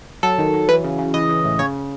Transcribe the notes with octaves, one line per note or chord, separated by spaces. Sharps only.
F#3 A4
D#3
F#3
E3 B4
C#3
C#3
E3 D#5
E3
A2
C#3 C#5